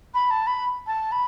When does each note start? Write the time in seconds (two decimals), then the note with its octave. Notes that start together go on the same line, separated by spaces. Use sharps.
0.14 B5
0.31 A5
0.47 B5
0.87 A5
1.12 B5